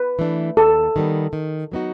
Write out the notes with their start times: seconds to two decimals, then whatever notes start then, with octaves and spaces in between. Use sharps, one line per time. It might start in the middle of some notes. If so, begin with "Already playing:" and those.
Already playing: B4
0.19 E3 A3 D4
0.57 D#2 A4
0.96 D#3 G3 B3
1.33 D#3
1.72 F#3 B3 D#4 F#4